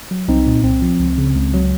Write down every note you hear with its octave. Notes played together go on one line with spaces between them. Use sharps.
F#3
C2 C4 D#4
A#2
C2 C4
F3
C#2
C#3
C#2
F#3